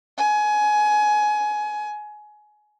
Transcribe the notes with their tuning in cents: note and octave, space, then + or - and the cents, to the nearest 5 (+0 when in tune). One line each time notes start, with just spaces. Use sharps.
G#5 +20